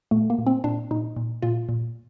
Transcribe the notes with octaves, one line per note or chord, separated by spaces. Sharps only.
A#2 A3
A#3
A#2
C4
A#2 D4
A#2 D#4
A#2
A#2 F4
A#2